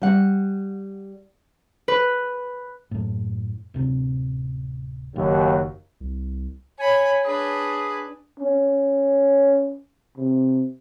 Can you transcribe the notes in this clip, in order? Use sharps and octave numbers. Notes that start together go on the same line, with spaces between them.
G3 F#5
B4
F#2 A2
D1 C3
F#1 D#2 F#3
C2
C#5 G#5 B5
D4 G#4 B4
C#4
C3